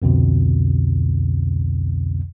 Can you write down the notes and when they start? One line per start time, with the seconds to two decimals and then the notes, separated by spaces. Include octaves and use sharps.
0.02 C2 F2 B2 D3